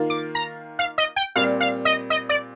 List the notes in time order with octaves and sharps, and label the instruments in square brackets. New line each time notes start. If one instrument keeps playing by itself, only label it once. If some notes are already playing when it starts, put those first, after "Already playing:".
Already playing: [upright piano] D#3 A#3 F4
[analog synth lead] D6
A#5
F5
D#5
G5
[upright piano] A#2 G3 C4 [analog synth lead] F5
[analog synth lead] F5
D#5
D#5
D5